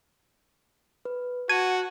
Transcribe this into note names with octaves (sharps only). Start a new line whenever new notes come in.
B4
F#4 F#5 A5 G#6 D#7